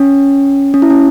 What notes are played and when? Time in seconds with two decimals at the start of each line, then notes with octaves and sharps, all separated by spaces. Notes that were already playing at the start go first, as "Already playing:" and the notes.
Already playing: C#4
0.74 C#4
0.82 E4
0.90 C#4